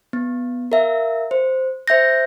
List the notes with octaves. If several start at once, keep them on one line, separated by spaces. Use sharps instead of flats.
B3
A#4 E5 F5
C5
C5 E5 G6 A#6